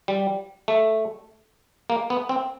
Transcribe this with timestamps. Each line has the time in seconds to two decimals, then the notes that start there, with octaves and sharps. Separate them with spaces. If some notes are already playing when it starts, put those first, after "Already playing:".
0.08 G3
0.68 A3
1.90 A#3
2.10 B3
2.29 C4